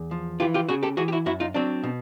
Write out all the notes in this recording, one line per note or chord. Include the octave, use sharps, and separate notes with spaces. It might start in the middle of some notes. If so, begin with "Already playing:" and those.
Already playing: E2
F3
E3 F4 G4
F4 G4
C#3 F#4 G#4
G4 A4
E3 F#4 G#4
G4
E4 F#4
F#2 E4 F#4
D#4 F4
F#3 C4 D4
B2